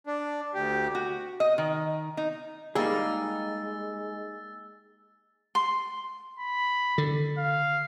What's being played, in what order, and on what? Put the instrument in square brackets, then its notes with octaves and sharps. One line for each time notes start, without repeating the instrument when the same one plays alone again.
[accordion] D4
D2 G4
[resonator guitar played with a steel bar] F#4
D#5
D#3
D#4
[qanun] G3 A#3 [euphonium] G#3 [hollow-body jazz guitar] D#4 G#4 [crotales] E6 A6
[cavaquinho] C6
[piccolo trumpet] B5
[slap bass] D3
[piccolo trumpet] F5